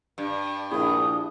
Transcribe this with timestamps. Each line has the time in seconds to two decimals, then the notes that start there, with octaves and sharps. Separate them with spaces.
0.18 G2
0.71 A#1 E4 G#4 D#6